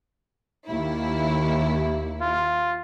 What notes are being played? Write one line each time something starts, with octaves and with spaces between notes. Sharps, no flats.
D#2 E4
F4